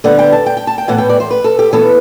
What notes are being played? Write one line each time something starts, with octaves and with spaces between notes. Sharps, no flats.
D3 G3 B3 F#5
G5
A5
G5
G5
A5
G5
A2 E3 B3 F#5
G5
D5
C5
B4
A4
G4
E3 B3 A4